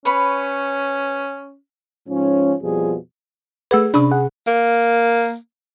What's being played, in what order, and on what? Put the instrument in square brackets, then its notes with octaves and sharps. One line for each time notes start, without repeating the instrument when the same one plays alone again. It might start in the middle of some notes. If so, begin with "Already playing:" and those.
[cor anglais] C#4 [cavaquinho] B4 C#5 B5
[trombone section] G#2 F3 C#4
F2 B2 F3 G3 G#4
[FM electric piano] A3 B4 [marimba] G#4 F#5 E6
[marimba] C3 C#4 B5 [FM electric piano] D4
[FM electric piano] G#4 F#5
[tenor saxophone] A#3